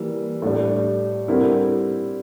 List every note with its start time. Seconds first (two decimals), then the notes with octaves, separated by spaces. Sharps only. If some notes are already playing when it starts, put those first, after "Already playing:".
Already playing: E3 G3 A#3
0.42 A2 G3 D4
1.28 D3 G3 C4 E4 A#4